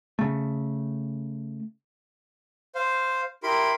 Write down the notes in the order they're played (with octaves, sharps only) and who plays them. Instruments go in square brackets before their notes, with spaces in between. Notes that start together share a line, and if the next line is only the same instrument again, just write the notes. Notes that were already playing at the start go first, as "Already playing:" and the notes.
[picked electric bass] C#3 A3
[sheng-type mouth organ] C5 F5
E4 G4 A#4 B5 C6